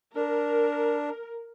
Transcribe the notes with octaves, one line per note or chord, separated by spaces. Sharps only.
D4 A#4